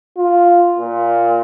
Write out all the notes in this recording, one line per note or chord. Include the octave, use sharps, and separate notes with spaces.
F4
A#2